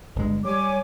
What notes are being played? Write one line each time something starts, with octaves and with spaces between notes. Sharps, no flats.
G1 G#3
G3 C#5 G#5 D6